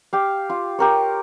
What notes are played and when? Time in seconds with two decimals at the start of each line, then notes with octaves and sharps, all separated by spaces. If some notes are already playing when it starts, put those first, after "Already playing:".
0.13 G4 F5
0.49 F4
0.79 G4 A#4 C#5